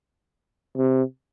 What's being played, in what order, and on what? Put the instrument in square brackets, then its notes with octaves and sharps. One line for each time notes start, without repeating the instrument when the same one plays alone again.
[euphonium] C3